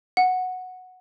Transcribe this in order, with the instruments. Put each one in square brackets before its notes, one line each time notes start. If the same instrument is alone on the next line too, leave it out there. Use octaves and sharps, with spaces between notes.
[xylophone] F#5